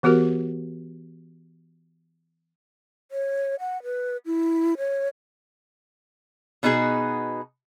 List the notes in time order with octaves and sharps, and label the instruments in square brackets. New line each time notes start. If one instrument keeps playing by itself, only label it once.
[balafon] E3 B3 F#4 G4 A#4
[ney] C#5
F#5
B4
E4
C#5
[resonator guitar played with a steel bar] B2 B3 D#4 F#4 G#4